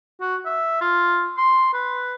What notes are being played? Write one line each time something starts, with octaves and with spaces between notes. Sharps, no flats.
F#4
E5
F4
C6
B4